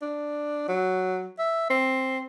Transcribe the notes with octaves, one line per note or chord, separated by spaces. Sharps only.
D4
F#3
E5
C4